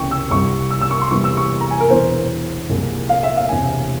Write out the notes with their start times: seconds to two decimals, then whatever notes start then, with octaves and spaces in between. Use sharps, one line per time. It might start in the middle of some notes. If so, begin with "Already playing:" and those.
Already playing: C#2 C3 E3 G5 C#6
0.11 E6
0.31 C2 C3 G3 C#6
0.70 E6
0.81 E6
0.91 C#6
1.01 C6
1.10 E2 C3 E3 G3 C#6
1.24 E6
1.37 C#6
1.61 A#5
1.71 G#5
1.80 A#4
1.90 E1 E2 E3 C5
2.70 C2 A#2 F3 G#3
3.09 F5
3.23 E5
3.37 F5
3.49 E1 E2 C3 G#5